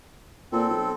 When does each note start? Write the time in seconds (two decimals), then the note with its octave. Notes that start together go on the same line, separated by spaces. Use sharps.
0.52 A#2 C4 A4
0.69 B1